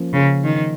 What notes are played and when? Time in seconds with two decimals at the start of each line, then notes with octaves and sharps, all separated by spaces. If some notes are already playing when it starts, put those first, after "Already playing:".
Already playing: F3 A#3 C#4 F4
0.13 C#3
0.44 D#3